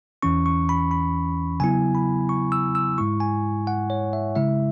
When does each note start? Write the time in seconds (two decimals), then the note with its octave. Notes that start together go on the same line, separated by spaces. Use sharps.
0.22 E2 E3 C#4 C#6
0.46 C#6
0.69 B5
0.91 B5
1.60 C#3 F#3 B3 E4 G#5
1.95 B5
2.29 C#6
2.52 E6
2.75 E6
2.98 G#2 G#3 E4 C#6
3.20 G#5
3.67 F#5
3.90 C#5
4.13 E5
4.36 C#3 G#3 E4 E5